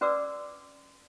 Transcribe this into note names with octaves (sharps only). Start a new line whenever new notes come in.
C#4 F#4 B4 D5 D6 E6